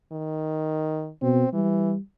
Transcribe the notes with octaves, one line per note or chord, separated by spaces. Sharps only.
D#3
B2 C4
E3 G3